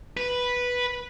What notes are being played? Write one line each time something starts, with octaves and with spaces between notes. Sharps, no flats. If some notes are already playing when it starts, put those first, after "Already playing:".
B4